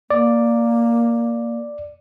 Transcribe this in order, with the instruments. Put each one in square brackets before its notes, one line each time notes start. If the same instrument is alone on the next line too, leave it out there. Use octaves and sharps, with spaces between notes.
[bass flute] A#3 [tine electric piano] D5